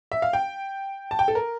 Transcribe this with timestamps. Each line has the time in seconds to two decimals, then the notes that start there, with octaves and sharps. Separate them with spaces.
0.12 E5
0.22 F5
0.33 G5
1.11 A5
1.19 G5
1.28 A4
1.35 A#4